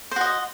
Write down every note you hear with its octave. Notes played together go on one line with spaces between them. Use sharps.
F#4 C5 D#5